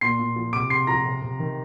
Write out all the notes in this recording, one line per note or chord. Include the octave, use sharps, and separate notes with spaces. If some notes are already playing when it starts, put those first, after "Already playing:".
A#2 C6 C7
A#2
F3
C3 D6 D7
C3 C6 C7
F3 A#5 A#6
C3
C3
D#3